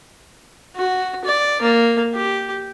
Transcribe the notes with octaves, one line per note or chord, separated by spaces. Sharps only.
F#4
D5
A#3
G4